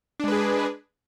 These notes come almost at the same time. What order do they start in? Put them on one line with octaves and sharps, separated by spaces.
D4 G#3 B4 G#4